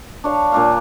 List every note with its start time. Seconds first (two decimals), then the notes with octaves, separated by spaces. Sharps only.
0.24 D4 C#5 F5
0.52 A#2 D4 F5